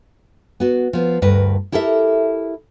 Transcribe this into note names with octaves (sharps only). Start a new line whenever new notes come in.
B3 F#4
F3 B3
D2 G2 A#4 B4
E4 G4 A4 A#4 E5